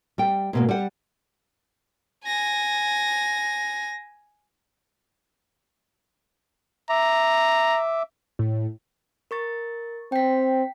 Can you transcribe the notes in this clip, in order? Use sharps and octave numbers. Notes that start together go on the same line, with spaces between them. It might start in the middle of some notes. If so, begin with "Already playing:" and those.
G3 G5
G#2 B2 A#3
G3 F#5
G#5 A#6
E5 A#5 D6
A2
A#4 C#6 A6
C4 G5 B6